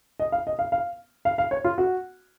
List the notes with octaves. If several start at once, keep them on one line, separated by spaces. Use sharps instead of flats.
D#5
F5
D#5
F5
F5
F5
F5
C#5
F4
F#4